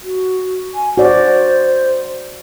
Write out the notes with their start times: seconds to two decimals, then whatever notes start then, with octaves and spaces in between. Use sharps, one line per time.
0.03 F#4
0.75 G#5
0.97 F#4 C5 D5